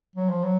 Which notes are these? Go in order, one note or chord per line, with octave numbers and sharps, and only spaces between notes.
F#3
F3
F#3